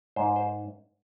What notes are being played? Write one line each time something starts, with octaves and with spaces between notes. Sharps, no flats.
G#2 C5
C5